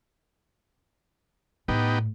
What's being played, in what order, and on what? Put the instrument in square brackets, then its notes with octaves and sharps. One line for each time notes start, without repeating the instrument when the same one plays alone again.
[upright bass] A2 [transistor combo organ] B3 D#4 G4